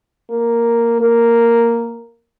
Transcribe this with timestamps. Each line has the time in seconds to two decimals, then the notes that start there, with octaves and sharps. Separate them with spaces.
0.30 A#3
1.01 A#3